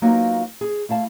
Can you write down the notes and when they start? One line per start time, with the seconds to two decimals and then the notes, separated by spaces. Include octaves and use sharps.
0.02 F#3 A#3 B3 D#4 F4 F#4
0.61 G#4
0.89 A3 E4 F5 A5